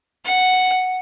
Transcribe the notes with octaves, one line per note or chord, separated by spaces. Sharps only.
F#5